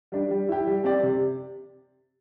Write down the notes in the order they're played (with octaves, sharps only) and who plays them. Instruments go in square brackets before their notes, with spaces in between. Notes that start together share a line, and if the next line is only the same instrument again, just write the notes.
[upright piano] G3 D4
G3
E4 G4
G3
C4 G4 D5
C3